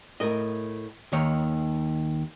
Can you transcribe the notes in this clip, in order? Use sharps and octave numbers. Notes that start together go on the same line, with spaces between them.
A2 A#4 D#5
D#2 D#3 D#4 C#5